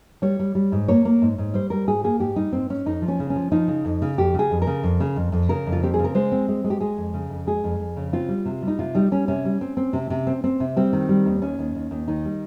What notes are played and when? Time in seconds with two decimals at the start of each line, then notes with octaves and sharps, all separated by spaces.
0.22 G3 C#5
0.39 G3
0.55 G3
0.72 G#2
0.88 A#3 C#5
1.05 A#3
1.22 G#2
1.38 G#2
1.54 G3 C5
1.70 G3 A#4
1.87 G#2 G#4
2.04 A#3 G#4
2.20 G#2 G4
2.36 G3 D#4
2.52 G#2 C4
2.70 G#2 C#4
2.86 F2 D#4
3.02 F3
3.08 C#4
3.19 C#3
3.30 C#4
3.35 F3
3.52 F3 D#4
3.68 C#3
3.85 F2
4.02 C#3
4.18 F2 G4
4.34 C#3
4.39 G#4
4.51 F2
4.62 A#4
4.67 C#3
4.83 F2
5.00 C#3
5.16 F2
5.32 F2
5.49 C#3 A#4
5.66 F2
5.72 F4
5.83 C4 G4
5.94 G#4
5.99 C#3
6.04 A#4
6.15 G#3 C5
6.32 C4
6.48 G#3
6.64 G#3
6.70 G4
6.80 G#3 G#4
6.97 F2
7.14 C#3
7.30 F2
7.47 G#3 G#4
7.64 F2
7.80 F2
7.97 C#3
8.13 C4 F4
8.29 G3
8.45 C3
8.62 G3
8.68 D#4
8.79 C3 F4
8.94 G3 D#4
9.11 G3 C#4
9.28 C3 C#4
9.45 G3
9.61 C4
9.77 C4
9.93 C3
10.10 C3
10.27 C4
10.44 C4
10.60 C3
10.76 G3 C4
10.93 D#3
11.09 G3
11.26 D#2
11.42 D#2 C#4
11.59 D#2
11.75 D#2
11.91 D#2
12.08 D#3 D#4
12.25 G3